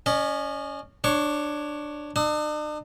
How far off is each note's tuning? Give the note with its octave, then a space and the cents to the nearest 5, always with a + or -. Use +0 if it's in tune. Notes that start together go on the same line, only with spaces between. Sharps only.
C#4 +15 D#5 -40
D4 +10 C#5 +0 C#6 +45
D4 +45 D#6 +45